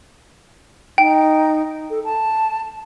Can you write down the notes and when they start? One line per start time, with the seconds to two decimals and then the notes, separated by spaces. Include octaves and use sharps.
0.98 D#4 G5
1.90 A4
2.05 A5